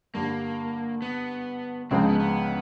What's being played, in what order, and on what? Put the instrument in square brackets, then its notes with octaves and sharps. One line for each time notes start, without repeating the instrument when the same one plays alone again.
[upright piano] G2 D3 G3 [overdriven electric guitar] A#3
[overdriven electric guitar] B3
[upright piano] C#2 C#3 F3 G#3 [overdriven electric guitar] C4
[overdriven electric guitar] B3
B3